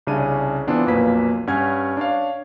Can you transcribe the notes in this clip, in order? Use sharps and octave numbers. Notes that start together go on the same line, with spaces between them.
C2 C#3 C#4 D4 D#7
E3 B3 C4 D4 F4
B1 F2 A#2 A#3 B4 B6
G2 C#4 F#5 G#5 F6 G#6
D4 C#5 F5